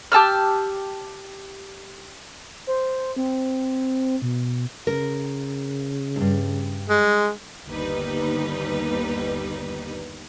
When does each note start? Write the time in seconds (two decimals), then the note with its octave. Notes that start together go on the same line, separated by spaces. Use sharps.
0.12 G4 A5 E6 F6
2.67 C5
3.16 C4
4.22 B2
4.87 C#3 A#4
6.16 D2 G2
6.89 G#3
7.67 G1 D#2 G3 D#4 B4